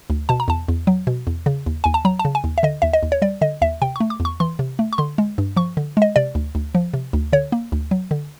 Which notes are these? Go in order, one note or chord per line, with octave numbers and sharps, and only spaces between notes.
D2
B2 A5
A#5
E2 A5
E2
F#3
B2
E2
C#3
D#2
D#2 G#5
A5
F#3 A#5
A5
C#3
G#5
D#2
E5
D3 D#5
D#2 E5
D#5
D#2
C#5
G3 D5
D3 D#5
D#2 E5
C3 G5
A3 C#6
D6
E2
C#6
E3 C6
C3
A3
C#6
D3 C6
G#3
G2
F3 C#6
D3
G#3 D#5
C3 D5
D2
D2
F3
C3
D2
D3 C#5
A#3
D2
F#3
D3